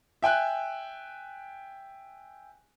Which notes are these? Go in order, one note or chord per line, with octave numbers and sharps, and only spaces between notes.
E5 G5 G#5 F#6